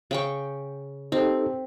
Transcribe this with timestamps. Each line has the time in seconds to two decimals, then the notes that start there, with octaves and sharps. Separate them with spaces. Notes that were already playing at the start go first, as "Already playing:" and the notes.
0.11 C#3 G5 C#6
1.12 C4 D#4 G4 A4